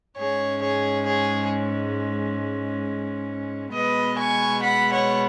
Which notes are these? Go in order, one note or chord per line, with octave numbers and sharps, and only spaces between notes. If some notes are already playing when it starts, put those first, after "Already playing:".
G#2 G#3 C#4 G#4 C#5
G#4 C#5
G#4 C#5
B2 G#3 B3 B4 D#5
G#5 C#6
F#5 B5
C#5 F#5